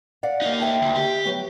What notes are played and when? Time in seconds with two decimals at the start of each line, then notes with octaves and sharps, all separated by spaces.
0.23 D5 F5 F#5
0.42 A#3 D#4
0.60 E5 G5 A5
0.82 D2
0.96 G4
1.25 F#3 B3